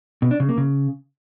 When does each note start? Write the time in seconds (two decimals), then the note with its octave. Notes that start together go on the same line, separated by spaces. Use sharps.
0.22 B2
0.31 D4
0.40 C#3
0.49 A#3
0.58 C#3